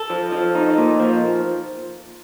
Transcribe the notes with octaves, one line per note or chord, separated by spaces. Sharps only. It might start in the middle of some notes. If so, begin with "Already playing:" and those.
Already playing: A4
F3
F3
D#4
A#2
F3